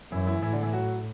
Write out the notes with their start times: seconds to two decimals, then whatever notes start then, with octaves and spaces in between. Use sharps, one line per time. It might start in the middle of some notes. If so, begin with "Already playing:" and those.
0.12 F#2 E3 E4
0.27 E3 E4
0.42 A2 E3 E4
0.53 D3 D4
0.63 E3 E4
0.73 F#3 F#4